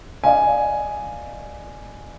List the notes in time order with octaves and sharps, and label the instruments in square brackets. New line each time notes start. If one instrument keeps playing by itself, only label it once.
[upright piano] D5 D#5 F5 G#5